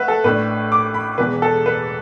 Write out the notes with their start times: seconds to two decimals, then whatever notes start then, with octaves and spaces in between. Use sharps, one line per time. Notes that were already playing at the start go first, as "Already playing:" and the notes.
Already playing: A3 B4 E5 F#5
0.08 A4
0.24 A1 A2 A3 D4 B4
0.72 D6
0.94 B5
1.18 E1 E2 E3 B4
1.42 A4
1.66 B4